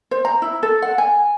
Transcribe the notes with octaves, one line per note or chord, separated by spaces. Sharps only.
C5
A#5
E4
A4
F#5
G#5